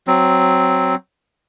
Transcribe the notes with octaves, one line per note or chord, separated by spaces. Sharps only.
F#3 C4